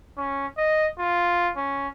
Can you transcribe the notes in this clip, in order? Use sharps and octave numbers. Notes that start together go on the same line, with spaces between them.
C#4
D#5
F4
C#4